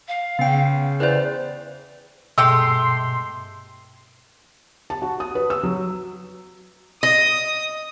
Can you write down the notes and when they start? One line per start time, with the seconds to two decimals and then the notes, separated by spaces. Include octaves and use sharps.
0.08 F5
0.39 C#3 B3 G5
1.00 E2 B4 C5 D5
2.38 G2 B2 G#3 A3 G4 C6 E6
4.90 A5
5.02 F#4
5.20 D#6
5.35 B4
5.50 E6
5.63 F#3
7.03 D#5 D#6